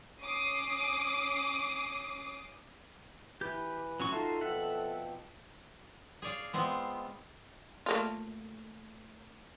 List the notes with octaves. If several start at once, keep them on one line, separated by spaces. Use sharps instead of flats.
C#4 D6 D#6 C7
E3 G4 B4 G6
F#3 C#4 C#6
D#4 F4 F#4 A4 E5 A5 C6
B2 F3 C4 E5 F#5
G#4 C#5 D5 F5
G#3 B3 C4 F4
A3 A#3 F4